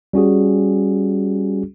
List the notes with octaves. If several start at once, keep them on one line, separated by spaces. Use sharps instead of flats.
G3 C#4 F#4 G#4